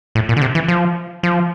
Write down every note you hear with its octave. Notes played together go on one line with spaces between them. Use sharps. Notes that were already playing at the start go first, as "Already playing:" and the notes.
A2
A#2
D3
C3
E3
F3
F3